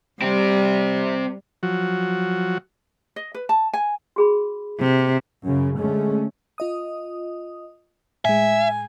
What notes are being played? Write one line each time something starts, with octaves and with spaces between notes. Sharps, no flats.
G3 C4 G4
F3 F#3 F#4
D#5
B4
A5
G#5
F#4 G#4 B5
C3
F#2 C#3 C#4
D3 G#3 A3 C#4
F4 D#5 D#6
A2 G#3 E5 G#5